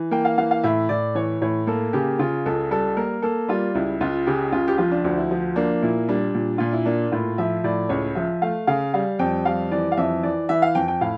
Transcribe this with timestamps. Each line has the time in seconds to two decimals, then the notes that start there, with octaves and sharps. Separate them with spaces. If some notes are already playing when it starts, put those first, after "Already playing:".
Already playing: E3
0.11 A#3 G5
0.25 F5
0.38 E3 F5
0.51 F5
0.64 A2 E5
0.89 A2 D5
1.15 E3 C#5
1.42 A2 C#5
1.67 A#3 A4
1.93 C#3 G4
2.19 C#3 F4
2.46 C#2 A4
2.71 G3 A4
2.97 A#3 A#4
3.22 A#3 A4
3.48 G3 F4
3.75 C#2 E4
4.01 C#2 F4
4.27 C#3 G4
4.52 C#2 F4
4.68 G4
4.78 F3 F4
4.91 D4
5.04 D2 D4
5.18 E4
5.31 F3
5.56 A#3 D4
5.83 A#2 E4
6.08 G3 D4
6.35 A#2
6.58 A#2 F4
6.73 E4
6.86 A#3 D4
7.12 A2 F4
7.38 F3 E5
7.64 A2 D5
7.89 C#2 C#5
8.15 F3 E5
8.42 A3 F5
8.67 C#3 F5
8.94 G3 F5
9.19 F2 G5
9.45 G3 F5
9.71 E3 D5
9.92 F5
9.97 F2 E5
10.23 E3 D5
10.49 E3 E5
10.62 F5
10.75 F2 G5
10.88 G5
11.01 A2 F5